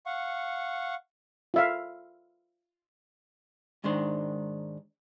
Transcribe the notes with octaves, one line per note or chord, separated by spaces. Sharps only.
F5 F#5 C#6
F4 E5 F5
G#2 D#3 G#3 D4 C5